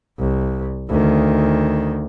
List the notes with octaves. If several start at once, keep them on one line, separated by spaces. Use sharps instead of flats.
C2
D2 D#3